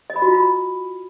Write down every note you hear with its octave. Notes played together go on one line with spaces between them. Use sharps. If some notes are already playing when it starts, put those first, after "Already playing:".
D#5
B5
F#4
F4
B5